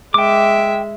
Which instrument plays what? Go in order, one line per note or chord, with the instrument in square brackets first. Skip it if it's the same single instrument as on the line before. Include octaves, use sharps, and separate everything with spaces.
[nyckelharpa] G#3 E5 [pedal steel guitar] G5 D6